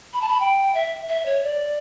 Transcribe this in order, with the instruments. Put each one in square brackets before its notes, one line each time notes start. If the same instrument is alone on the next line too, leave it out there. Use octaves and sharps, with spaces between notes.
[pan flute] B5
A5
B5
G5
E5
E5
C#5
D5